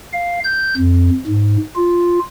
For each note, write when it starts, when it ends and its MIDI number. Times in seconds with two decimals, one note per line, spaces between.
0.13 0.39 77
0.44 0.75 91
0.77 1.10 41
1.27 1.57 44
1.76 2.19 65